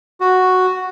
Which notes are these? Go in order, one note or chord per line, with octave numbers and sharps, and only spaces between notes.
F#4